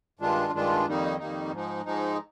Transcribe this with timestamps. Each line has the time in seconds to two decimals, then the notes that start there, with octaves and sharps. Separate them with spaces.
0.19 G2 D#3 G#3 D4 F4
0.53 G2 D#3 G#3 D4 F4
0.86 F2 D#3 G3 A#3 D#4
1.19 F2 D#3 G3 A#3 D#4
1.52 G#2 F3 G#3 D#4
1.84 G#2 F3 G#3 D#4